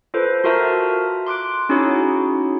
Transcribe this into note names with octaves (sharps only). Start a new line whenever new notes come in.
F4 A4 B4 C5
F4 F#4 A#4 E5 A5 A#5
C6 D6 F#6 D7
C#4 D#4 E4 F#4 G#4 C#5